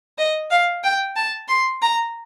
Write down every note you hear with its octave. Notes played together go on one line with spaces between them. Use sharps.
D#5
F5
G5
A5
C6
A#5